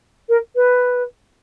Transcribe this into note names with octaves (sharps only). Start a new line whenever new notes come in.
A#4
B4